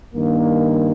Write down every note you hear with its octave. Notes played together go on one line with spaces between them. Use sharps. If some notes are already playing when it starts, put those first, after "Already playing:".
G2 D#3 A#3